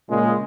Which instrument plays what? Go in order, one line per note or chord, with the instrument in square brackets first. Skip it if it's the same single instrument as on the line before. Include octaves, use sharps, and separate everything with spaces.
[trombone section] A#2 C#3 [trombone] G#3